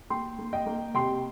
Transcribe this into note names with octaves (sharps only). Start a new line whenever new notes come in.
A#3 G5 C6
A#3
D#5 G5
A#3
C3 G5 C6